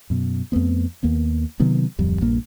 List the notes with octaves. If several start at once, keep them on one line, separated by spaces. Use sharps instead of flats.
F#2 B2
F2 A3 B3 C4
D#2 A#3 B3
C3 D#3 F#3 B3
D1 F2 G3
A#1 G2 A#3